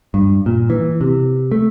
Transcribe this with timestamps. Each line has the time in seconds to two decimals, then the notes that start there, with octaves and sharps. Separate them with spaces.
0.14 G2
0.46 A#2
0.70 E3
1.01 C3
1.52 A3